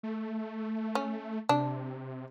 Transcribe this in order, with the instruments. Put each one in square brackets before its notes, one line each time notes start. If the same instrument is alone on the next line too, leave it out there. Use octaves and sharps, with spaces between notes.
[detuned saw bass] A3
[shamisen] C#4
[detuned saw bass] C3 [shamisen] D4